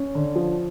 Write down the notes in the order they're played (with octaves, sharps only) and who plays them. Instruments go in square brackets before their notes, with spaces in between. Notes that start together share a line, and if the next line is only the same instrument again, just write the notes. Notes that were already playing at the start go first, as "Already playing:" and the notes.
Already playing: [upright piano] C#4
[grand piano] D3
F3